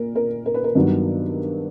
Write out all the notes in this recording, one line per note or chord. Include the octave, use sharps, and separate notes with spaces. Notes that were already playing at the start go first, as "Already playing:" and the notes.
Already playing: A#2 A#4
A#4
A#4
B4
A#4
G2 D#3 F#3 B3 D4